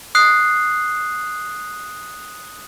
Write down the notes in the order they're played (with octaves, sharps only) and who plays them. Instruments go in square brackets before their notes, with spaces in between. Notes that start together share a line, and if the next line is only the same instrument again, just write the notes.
[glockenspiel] D#6 F#6 C7